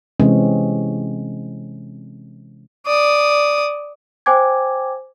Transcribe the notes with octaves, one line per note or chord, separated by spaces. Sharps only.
C3 E3 G#3 C4 C#4
D5 D#6
C5 G5 G#5 D6 G#6